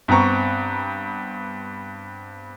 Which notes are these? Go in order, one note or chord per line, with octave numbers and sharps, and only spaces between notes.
G2 B3 C4 A#5 C#6